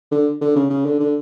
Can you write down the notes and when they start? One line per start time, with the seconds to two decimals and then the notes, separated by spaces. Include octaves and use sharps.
0.11 D3
0.41 D3
0.56 C#3
0.70 C#3
0.86 D3
1.00 D3